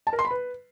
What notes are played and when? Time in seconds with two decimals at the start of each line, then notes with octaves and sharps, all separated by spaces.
0.07 A5
0.13 A#4
0.19 C6
0.25 B5
0.31 B4